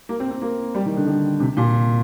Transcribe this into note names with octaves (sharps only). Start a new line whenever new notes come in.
A#3
C4
C4
A#3
G3
D#3
D3
D3
C3
A#2